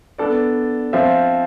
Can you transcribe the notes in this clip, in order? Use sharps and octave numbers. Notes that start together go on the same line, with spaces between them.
B3 D4 A4 D5
F3 C4 F4 C5 E5